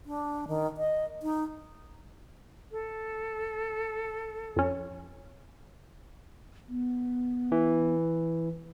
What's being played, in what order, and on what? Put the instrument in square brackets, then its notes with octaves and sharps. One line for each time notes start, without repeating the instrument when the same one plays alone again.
[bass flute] D4
D#3
D#5
D#4
[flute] A4
[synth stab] F2 C#4
[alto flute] B3
[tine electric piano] E3